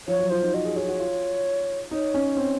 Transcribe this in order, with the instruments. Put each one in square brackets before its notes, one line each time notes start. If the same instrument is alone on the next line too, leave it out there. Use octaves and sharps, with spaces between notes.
[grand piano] F3 [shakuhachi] C#5
[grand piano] F#3
[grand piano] F4 [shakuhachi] C5
[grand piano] D#4
[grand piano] F#4 [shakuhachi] D#5
[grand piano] G#4
[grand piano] G#4 [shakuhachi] C#5
[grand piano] F#4
F4
[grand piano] D#4 [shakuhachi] C#5
[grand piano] C#4
C4